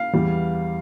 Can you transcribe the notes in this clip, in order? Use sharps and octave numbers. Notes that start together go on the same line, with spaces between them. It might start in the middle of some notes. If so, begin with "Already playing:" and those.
Already playing: F5
E2 E3 G3